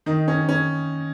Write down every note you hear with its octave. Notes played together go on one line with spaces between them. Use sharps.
D#3 D#4
C#4
C#4